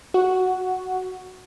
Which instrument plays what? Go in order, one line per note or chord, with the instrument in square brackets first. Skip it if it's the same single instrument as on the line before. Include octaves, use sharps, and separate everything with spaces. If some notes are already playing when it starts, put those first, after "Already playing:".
[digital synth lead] F#4